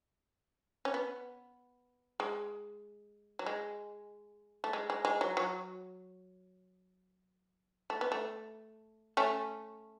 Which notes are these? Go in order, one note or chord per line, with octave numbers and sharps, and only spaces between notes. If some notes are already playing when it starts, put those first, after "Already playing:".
C#4
B3
G#3
F#3
G#3
A3
G#3
G#3
G#3
F#3
F#3
A3
B3
A3
A3 C#4